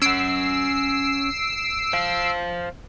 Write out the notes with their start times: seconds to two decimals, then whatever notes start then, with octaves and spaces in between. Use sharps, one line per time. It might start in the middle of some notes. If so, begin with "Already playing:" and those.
0.02 C#4 F#5 E6 C7 D7
1.93 C5 F5